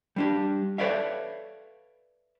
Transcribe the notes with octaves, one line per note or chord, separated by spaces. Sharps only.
G3 D4 G4
A4 B4 C#5 D5 E5 F5